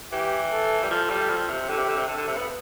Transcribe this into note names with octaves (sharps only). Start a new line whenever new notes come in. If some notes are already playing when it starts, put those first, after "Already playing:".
E3 G4
A4
G3
F3 A4
G3
F3
C3
D3 G4
C3
D3
C3
D3 A4
D3
C3
B3